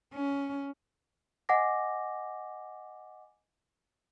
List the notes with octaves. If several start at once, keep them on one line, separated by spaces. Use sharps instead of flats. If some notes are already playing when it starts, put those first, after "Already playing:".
C#4
D#5 F#5 G#5 D6 A#6